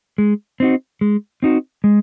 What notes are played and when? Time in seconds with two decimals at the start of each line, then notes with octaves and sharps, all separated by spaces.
0.18 G#3
0.60 C4 D#4 F#4
1.01 G#3
1.43 C4 D#4 F#4
1.84 G#3